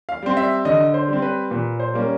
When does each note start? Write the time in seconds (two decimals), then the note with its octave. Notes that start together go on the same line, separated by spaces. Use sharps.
0.09 F5
0.23 G3 C4
0.37 E5
0.65 D3 D#5
0.94 C5
1.08 G3 C4
1.22 B4
1.51 A#2 B4
1.80 C5
1.93 G3 A#3 C#4